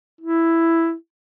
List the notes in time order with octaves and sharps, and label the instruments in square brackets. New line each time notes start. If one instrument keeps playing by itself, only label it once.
[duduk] E4